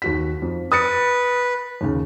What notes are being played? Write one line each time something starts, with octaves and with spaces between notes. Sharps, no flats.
D#2 F#4 B6
F2
B4 D#6 A6 C#7
D#2 C#3